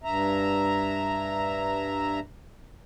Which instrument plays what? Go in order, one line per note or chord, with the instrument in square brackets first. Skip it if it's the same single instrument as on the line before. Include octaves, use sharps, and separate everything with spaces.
[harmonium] G2 E5 A#5